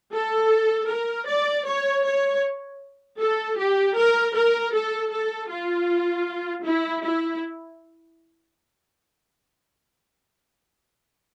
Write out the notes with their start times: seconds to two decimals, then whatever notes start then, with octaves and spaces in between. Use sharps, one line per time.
0.13 A4
0.89 A#4
1.27 D5
1.66 C#5
2.05 C#5
3.19 A4
3.58 G4
3.97 A#4
4.34 A#4
4.73 A4
5.11 A4
5.49 F4
6.64 E4
7.03 E4